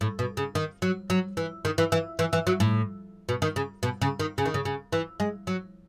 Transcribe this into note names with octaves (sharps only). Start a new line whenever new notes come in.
A2
B2
C#3
D#3
F#3
F#3
E3
D#3
E3
E3
E3
E3
F#3
A2
B2
D#3
C#3
B2
C#3
D#3
C#3
D#3
C#3
C#3
E3
G#3
F#3